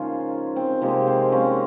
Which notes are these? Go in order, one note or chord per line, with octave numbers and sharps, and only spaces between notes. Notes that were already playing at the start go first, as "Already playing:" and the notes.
Already playing: C#3 F3 G#3 A#3 C#4 D#4 F4
C4
C3 F3 G#3 A#3
C4
A#3 C#4